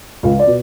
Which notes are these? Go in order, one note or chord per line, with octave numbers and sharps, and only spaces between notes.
C#2 F5
D5
B2